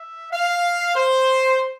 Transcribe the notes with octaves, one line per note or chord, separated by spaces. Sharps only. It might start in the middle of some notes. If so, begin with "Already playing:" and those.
Already playing: E5
F5
C5